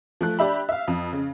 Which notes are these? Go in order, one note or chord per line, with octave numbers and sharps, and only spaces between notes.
F3 A3 F#6
D4 G4 E5 B5
E5 F5
F2
C#3